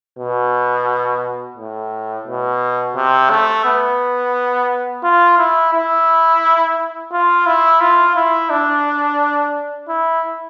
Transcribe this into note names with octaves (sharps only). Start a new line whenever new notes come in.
B2
A2
B2
C3
A3
B3
F4
E4
E4
F4
E4
F4
E4
D4
E4